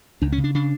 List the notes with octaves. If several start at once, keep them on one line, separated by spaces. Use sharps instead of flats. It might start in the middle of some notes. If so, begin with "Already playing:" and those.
C#2 D4
C#4
C#3
D4
C#3 D4